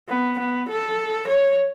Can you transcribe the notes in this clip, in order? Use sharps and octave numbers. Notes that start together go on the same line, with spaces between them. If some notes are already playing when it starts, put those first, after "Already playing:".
B3
B3
A4
C#5